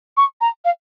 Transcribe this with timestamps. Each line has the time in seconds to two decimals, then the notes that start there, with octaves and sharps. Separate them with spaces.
0.17 C#6
0.41 A#5
0.65 F5